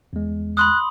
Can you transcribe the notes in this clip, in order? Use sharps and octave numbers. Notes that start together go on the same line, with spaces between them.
E2 G#3
B5 C6 D#6 F#6